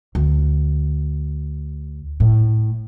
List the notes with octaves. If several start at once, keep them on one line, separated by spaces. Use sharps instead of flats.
D2
A2